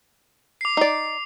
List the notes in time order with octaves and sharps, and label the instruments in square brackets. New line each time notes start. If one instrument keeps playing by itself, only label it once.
[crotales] D6 C7
[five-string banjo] D#4 D5